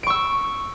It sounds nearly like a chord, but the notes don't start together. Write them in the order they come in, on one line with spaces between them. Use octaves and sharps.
D7 C#6 E6